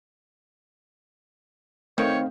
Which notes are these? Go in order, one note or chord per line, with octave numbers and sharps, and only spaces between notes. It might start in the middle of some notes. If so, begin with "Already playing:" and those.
D#3 A3 C4 C#5 F5 G5